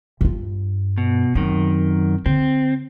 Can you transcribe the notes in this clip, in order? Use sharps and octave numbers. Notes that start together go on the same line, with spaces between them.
G2 F4
B2
F#2 D#3 C4
D3 C4